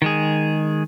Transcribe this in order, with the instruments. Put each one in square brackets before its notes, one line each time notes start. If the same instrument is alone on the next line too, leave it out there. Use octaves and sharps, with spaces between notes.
[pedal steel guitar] D#3 G#3 G#4